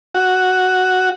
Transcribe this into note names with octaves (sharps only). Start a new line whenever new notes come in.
F#4